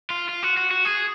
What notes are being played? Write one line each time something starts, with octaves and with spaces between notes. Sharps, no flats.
F4
F4
F#4
F#4
F#4
G#4